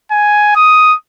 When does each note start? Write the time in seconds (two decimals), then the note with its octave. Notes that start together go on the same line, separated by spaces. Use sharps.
0.11 G#5
0.56 D#6